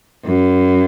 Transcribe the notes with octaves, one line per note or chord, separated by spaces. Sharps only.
F#2